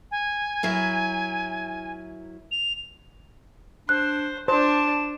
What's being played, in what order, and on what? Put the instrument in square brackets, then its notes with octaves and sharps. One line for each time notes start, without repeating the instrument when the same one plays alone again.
[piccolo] G#5
[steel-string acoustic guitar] F#3 E4 A#4
[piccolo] F7
[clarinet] D4 [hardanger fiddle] C5 [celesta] F#6
[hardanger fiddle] D4 [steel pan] C5 [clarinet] A5